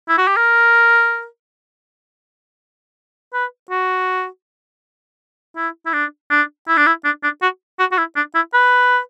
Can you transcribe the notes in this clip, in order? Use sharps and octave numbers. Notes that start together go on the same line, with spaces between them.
E4
F#4
G4
A#4
B4
F#4
E4
E4
D4
D4
E4
D4
E4
D4
D4
F#4
F#4
F#4
E4
D4
E4
B4